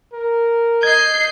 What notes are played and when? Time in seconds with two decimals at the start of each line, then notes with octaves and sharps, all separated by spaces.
0.13 A#4
0.83 D#5 G6 G#6 C7